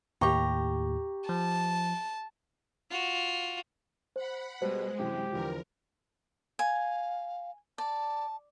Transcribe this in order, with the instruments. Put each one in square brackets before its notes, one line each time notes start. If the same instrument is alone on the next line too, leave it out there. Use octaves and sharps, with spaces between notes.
[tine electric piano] D#2 A2 [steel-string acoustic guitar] G4 A#5 [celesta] G5 C#6 D6
[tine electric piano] F3 [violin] A5
[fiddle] F4 F#4
[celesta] C5 [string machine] F#5 B5
[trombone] B2 [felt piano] G3 [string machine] G#3 [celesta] C5
[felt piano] F#2 C3 E3 [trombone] G4
[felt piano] E2 D3 F3 [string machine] A#4
[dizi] F5 [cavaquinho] G#5
[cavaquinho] D5 [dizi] A5